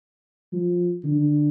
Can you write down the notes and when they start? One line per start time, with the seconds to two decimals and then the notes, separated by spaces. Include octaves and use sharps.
0.53 F3
1.04 D3